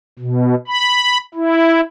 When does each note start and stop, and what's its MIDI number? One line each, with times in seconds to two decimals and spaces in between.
0.19 0.55 47
0.68 1.18 83
1.35 1.81 64